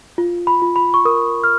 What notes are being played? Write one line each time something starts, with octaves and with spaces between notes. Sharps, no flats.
F4
B5
F4
B5
C#6
A#4 D#6
F6